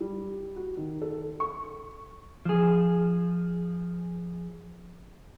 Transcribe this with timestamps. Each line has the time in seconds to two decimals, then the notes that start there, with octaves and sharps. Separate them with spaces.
0.01 G3
0.56 F#4
0.77 D#3
1.02 A4
1.40 C#6
2.45 F3 G#4